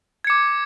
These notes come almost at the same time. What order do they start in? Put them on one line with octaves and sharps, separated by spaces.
G#6 C#7 D6